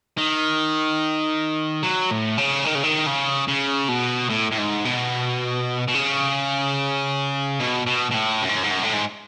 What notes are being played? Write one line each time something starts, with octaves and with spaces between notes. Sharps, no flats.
D#3
F#3
A2
C#3
D#3
C#3
D#3
C#3
C#3
B2
A2
A2
G#2
B2
B2
C#3
B2
B2
B2
A2
F#2
G#2
F#2
G#2
F#2
A2
G#2